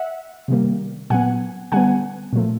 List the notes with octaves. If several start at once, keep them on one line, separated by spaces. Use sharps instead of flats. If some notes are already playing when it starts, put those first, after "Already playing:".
Already playing: E5 F#5
C3 D#3 G3 A#3
A#2 F#3 B3 F#5 G#5
D3 G3 B3 F#5 G#5
A#2 F3 A3